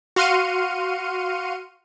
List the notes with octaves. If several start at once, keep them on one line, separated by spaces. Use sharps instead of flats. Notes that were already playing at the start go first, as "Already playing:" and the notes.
F#4 F5 C6 F6 C#7 D#7